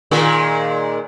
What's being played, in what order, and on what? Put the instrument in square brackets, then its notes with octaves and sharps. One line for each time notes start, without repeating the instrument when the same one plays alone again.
[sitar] A#2 D#3 G#3